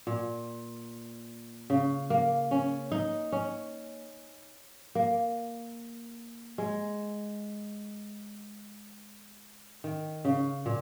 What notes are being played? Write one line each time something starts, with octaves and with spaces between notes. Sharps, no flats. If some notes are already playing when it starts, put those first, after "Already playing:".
A#2
C#3
A#3
C#4
D#4
C#4
A#3
G#3
D#3
C#3
A#2